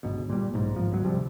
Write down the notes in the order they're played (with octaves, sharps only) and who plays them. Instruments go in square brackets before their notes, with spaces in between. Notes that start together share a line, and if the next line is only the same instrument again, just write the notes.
[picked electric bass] G1 C#2 B2
A#2 G3
B1 G#2
G#1 F3
G#1 C#2 G#2 F#3
D2 C3 F3 G3